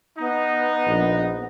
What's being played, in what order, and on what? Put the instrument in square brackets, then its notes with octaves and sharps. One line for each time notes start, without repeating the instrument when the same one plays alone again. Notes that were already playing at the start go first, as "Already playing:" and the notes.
[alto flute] B3 [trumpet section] D#4
[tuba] A#1